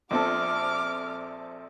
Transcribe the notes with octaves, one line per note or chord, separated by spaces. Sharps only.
A#1 C4 A4 D6 F6